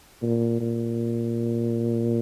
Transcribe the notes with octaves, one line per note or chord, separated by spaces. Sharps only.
A#2
A#2